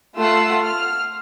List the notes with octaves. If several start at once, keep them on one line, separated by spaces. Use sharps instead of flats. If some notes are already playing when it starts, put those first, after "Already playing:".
A3 F4 F#5 E6 C7
F6